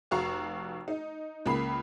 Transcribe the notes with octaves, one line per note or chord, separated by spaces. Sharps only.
F1 F#4 F5 A#5 C#6
D#4
C#2 C#3 A#3 B5 C7